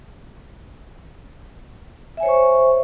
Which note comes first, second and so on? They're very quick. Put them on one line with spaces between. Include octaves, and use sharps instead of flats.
E5 G#5 C#5 C5 C#6